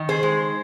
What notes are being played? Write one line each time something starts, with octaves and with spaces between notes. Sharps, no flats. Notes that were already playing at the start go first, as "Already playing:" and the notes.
Already playing: D#3
G#4 C5
G#3